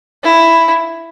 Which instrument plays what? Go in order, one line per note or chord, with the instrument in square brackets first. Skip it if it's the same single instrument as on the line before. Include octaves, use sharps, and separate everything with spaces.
[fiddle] E4